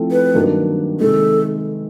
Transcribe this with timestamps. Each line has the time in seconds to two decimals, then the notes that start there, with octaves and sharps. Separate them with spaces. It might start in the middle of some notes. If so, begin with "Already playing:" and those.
Already playing: F3 A3 C4 E4 A4
0.12 B4
0.34 G2 D#3 F#3 A#3 D4
1.00 C3 D#3 G#3 A4